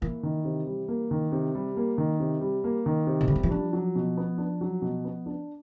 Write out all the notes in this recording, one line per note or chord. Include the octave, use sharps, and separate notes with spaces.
E3 A#3
D#3
C3
G3
A#3
D#3
C3
G3
A#3
D#3
C3
G3
A#3
D#3
C3
C#3
D3 G3
D#3
E3
F3 D4
F#3
B2
B3
D4
F#3
B2
B3
D4